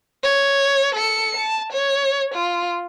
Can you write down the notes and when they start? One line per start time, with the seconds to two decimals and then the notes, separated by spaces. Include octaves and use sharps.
0.23 C#5
0.95 A4 C#7
1.37 A5
1.72 C#5
2.34 F4